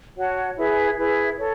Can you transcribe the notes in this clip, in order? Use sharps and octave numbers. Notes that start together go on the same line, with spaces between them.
F#4 C#5 F#5 A5
E4 G#4 B4 E5
E4 G#4 B4 E5
A4 C#5